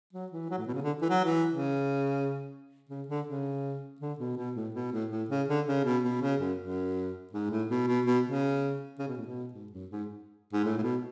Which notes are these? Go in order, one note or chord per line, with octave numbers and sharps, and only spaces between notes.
F#3
E3
F#3
A2
B2
C#3
D3
E3
F#3
E3
C#3
C#3
D3
C#3
D3
B2
B2
A2
B2
A2
A2
C#3
D3
C#3
B2
B2
C#3
F#2
F#2
G#2
A2
B2
B2
B2
C#3
C#3
B2
A2
B2
G#2
F#2
G#2
G#2
A2
A2
B2